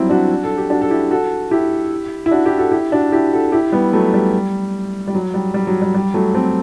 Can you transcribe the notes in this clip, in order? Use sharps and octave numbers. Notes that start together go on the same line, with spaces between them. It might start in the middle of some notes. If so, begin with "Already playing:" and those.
Already playing: F#3 G3 C4 E4
D4 F#4
A4
G4
D4 F#4
A4
E4 G4
F#4 A4
E4 G4
E4
D4 F#4
E4 G4
F#4 A4
E4 G4
D4 F#4
E4 G4
F#4 A4
E4 G4
G3 B3
F#3 A3
G3
G3
F#3
G3
G3
F#3
G3
G3
F#3 A3
A3 C4